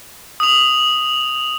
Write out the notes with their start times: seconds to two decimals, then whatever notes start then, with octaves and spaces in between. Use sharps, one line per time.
0.40 D#6 F7